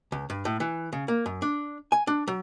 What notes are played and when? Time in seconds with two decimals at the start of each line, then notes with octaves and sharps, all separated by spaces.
0.12 C#2
0.30 G2
0.45 A2
0.60 E3
0.92 C#3
1.08 A#3
1.26 F#2
1.42 D4
1.92 G#5
2.07 D4
2.27 F#3